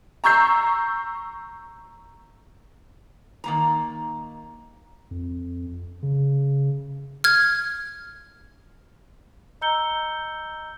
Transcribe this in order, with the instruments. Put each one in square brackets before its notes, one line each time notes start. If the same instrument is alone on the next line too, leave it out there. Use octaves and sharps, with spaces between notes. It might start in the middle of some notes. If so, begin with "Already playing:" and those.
[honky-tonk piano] A#5 C#6 E6 G6 C7
[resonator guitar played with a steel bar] D#3 A#3 A#5
[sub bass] F2
C#3
[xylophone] F6 G#6
[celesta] D#5 A#5 E6 G6 C#7 G7